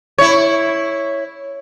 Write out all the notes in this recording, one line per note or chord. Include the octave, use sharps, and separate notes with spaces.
E4 C#5